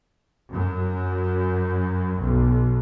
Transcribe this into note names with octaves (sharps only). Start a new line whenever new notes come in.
F#2
B1